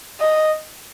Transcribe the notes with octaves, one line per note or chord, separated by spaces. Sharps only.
D#5